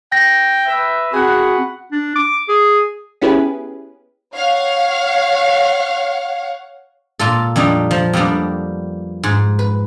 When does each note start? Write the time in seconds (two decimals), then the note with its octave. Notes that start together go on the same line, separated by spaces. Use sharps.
0.12 G5 A#6
0.66 B4 E5
1.13 C4 F#4 G#4 F#5 B5
1.92 D4
2.16 D6
2.48 G#4
3.21 B3 C#4 E4 G4 G#4 B4
4.35 C#5 F5 F#5
7.19 A#2 F4 A4
7.56 F2 G3 D4 D#4
7.91 F3
8.13 F2 G3 A#3 B3 D4
9.23 G#2
9.59 B4